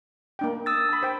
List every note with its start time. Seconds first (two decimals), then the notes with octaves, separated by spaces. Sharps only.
0.39 A#3 D4 G5
0.66 D#6 E6 A6
0.89 A5 B5
1.03 C5 G5